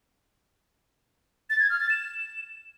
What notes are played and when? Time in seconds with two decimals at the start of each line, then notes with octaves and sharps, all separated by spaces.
1.50 A6
1.60 G#6
1.70 F6
1.80 A6
1.90 E7